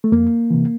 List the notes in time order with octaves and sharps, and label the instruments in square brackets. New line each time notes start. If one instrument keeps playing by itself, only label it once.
[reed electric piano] A3
F2 A#3
C3 E3